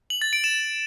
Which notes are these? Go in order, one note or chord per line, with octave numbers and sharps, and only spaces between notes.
F#7
A6
D7
E7